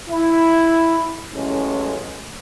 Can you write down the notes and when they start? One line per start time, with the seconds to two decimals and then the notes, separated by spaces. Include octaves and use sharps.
0.10 E4
1.34 A1 A2 F#3 G#3 A3 C#4